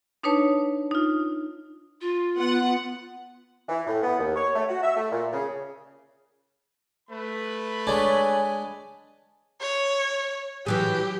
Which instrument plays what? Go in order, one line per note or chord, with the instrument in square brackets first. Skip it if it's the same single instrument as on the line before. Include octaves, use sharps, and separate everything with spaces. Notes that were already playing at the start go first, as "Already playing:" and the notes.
[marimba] D4 D#4 B4 C#5 A5
D#4 F4
[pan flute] F4
[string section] B3 F#5
[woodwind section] E3
A2
B3
D#2
C#5
A3
F#4
E5
A3
A#2
C#3
[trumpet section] A3 B4 B5
[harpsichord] G#3 D4 [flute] C#5 [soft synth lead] G#5
[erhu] C#5
[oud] E3 F#3 G#4 [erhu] G4